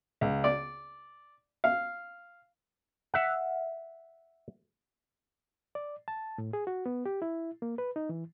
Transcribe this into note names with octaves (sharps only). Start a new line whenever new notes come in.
C#2
D5
F5
E5 F#5
D5
A5
A2
G#4
F#4
B3
G4
E4
A#3
B4
D#4
E3